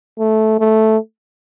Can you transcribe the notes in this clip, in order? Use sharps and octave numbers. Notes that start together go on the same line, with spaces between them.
A3
A3